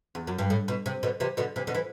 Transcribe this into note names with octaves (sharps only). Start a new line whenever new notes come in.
E2
F#2
G2
A2
B2
C3
B2 D3
C3 E3
B2 D3
C3 E3
B2 D3
E3